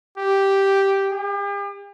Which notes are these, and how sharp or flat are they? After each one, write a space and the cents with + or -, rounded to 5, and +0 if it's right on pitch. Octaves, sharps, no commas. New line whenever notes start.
G4 -5
G4 +45